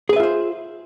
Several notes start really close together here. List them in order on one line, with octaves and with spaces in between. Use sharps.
G#4 B4 E5 F4 C5